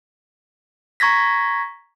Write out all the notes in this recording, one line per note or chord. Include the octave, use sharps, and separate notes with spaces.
A#5 C#6 G#6 A#6 B6